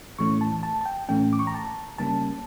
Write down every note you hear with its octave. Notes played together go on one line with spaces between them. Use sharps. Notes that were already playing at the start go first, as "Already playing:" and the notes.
A2 E3 A3 C#4 C#6
A5
A5
A5
G5
A2 E3 A3 C#4 G5
D6
C#6
A#5
A5
C#3 G3 A#3 C#4 A5